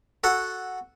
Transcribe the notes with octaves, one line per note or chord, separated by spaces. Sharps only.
F#4 A4 F#5